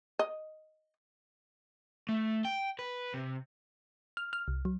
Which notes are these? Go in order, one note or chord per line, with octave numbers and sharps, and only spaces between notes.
D#5
A3
G5
B4
C3
F6
F6
C2
F#3